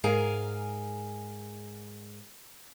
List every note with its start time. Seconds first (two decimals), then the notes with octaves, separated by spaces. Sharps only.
0.04 G#2 G#4 A#4 F5 G#5 A#5